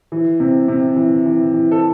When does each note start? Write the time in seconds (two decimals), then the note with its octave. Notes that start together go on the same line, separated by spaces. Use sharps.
0.12 E3
0.40 C3
0.68 C3
0.96 E3
1.26 E3
1.54 E3
1.72 A4